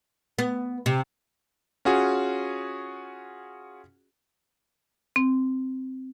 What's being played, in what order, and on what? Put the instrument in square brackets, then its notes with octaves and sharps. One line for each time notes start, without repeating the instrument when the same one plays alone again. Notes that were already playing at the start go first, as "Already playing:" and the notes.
[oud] B3
C3
[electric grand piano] C#4 F4 F#4 G#4
[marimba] C4